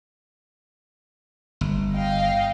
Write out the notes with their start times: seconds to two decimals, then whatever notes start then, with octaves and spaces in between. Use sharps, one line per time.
1.61 G1
1.93 D#5 F5 G5